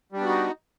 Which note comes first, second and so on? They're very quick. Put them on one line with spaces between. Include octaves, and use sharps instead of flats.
G3 D4 B3 F#4 D#4